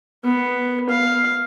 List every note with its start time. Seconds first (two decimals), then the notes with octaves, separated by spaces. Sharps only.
0.24 B3
0.89 F5